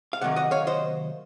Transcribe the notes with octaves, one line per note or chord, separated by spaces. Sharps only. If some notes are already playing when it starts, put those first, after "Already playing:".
F5
C3 D#3 F#3 A#3 F#5
D#5 F#5
C#5 F5
C5 D#5